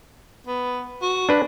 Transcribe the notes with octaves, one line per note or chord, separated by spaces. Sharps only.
B3
F#4
D4 B4